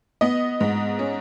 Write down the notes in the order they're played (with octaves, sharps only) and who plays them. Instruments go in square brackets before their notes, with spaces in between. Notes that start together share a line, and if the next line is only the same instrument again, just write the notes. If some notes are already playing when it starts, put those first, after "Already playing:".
[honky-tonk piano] B3 D#5
G#2
C#4